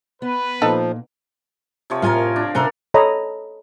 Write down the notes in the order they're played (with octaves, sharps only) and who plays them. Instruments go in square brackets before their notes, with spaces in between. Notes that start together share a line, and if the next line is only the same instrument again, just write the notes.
[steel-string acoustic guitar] B3 [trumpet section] B4
[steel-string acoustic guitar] A#2 [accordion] F3 [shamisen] D#4 A4 D#5
[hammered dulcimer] C3 F3 C#5
[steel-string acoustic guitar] A2 F4 G#5 [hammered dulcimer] A#4 F5
[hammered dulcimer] D4
[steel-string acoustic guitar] C3 C5 G#5 [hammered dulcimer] A4 A#4 F#5
[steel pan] A4 C#5 D#5 A#5 B5